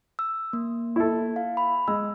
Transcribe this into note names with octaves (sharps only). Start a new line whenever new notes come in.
E6
A#3
E4 A4
F5
B5
G#3 E6